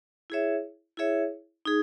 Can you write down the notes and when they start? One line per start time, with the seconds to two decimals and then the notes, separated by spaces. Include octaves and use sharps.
0.30 E4 G#4 C#5 E5
0.97 E4 G#4 C#5 E5
1.65 D#4 G#4